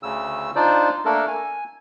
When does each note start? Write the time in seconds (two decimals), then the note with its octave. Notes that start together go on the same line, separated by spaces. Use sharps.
0.03 D2 C#3 E6
0.56 D4 D#4 F4 C5 D5
1.05 A3 A#3 D4 A4 A#4
1.28 G#5